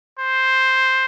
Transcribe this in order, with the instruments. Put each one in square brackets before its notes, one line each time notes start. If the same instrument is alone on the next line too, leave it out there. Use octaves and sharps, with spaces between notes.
[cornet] C5